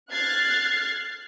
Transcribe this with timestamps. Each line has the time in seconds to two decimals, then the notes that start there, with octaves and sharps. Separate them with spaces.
0.11 F6 F#6 G#6 A6 C7